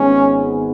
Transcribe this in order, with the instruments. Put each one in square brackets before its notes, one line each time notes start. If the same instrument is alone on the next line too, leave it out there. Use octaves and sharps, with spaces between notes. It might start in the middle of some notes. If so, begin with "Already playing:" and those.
Already playing: [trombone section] G#1 G#2 G#3 B3 C#4